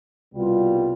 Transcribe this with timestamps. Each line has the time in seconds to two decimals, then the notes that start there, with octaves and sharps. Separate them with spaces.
0.33 C2 B2 G3 B3 F4